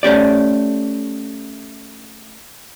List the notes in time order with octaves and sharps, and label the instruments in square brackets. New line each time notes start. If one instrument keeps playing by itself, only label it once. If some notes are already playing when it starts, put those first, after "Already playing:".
[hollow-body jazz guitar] A3 C#4 G4 D5